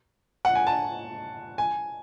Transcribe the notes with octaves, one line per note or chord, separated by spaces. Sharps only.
F#5
G#5
A5
G#5